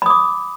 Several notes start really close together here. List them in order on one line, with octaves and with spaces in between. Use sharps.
B5 D#6 D6